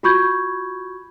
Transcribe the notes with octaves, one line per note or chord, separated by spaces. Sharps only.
F4 F#4 B5 C#6 G6 G#6